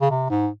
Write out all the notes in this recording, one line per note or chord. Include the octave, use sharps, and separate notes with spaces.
C#3
C3
G#2